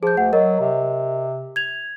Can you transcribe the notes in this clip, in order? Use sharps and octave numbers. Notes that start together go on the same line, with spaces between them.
F3 G#4 G6
D2 F#5
F#3 A#4 D#5
C3
G#6 F7